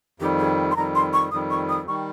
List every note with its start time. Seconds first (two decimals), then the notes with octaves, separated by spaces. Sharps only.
0.20 F2 D#3 G3 G4
0.39 G#4
0.71 C6
0.76 F2 D#3 G3 A#5
0.95 C6
1.13 C#6
1.31 F2 D#3 G3 D#6
1.50 C#6
1.69 D#6
1.87 D#3 G3 C#6